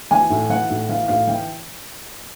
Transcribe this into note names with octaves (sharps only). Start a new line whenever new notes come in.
E3 G#5
A2
E3 F#5
A2
E3 F5
A2 F5
E3 G5